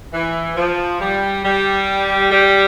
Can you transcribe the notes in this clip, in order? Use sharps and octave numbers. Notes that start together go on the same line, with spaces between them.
E3
F3
G3
G3
G3